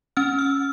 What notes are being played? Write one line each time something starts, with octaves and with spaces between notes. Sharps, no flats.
C#4 F6
E6